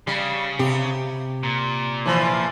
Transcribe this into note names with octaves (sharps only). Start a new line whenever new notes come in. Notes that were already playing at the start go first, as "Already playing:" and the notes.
C#3 G3
C3 G4
A#2
E3 F3